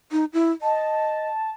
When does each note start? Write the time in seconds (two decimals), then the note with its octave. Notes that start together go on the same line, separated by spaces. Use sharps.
0.12 D#4
0.33 E4
0.62 D#5 A5